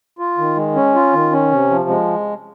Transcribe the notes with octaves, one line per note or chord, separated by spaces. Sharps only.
F4
D#3
G#3
C#4
F4
D#3
C#4
C3
F3
G#3